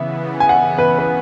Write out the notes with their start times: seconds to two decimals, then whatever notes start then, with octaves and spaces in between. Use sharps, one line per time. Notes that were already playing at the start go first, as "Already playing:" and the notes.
Already playing: C#3 E3 B3 E5
0.40 G#5
0.49 F#5
0.78 B4
0.99 B4